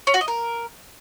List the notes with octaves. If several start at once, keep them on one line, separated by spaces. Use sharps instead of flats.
C#4
F#4
D#5
A#4